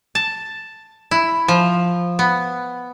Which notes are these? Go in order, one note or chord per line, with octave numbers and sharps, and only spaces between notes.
A5
E4
F3
B3